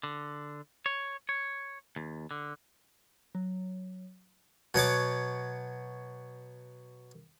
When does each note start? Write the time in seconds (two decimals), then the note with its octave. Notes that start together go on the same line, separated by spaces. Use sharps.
0.03 D3
0.86 C#5
1.29 C#5
1.96 D#2
2.31 D3
3.35 F#3
4.74 B2 F#3 C#5 D6